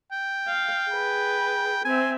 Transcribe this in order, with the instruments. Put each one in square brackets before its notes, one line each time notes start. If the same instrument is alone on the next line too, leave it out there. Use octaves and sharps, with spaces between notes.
[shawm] G5
[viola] F5
G#4 B4
[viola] C4 E5 [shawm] G#5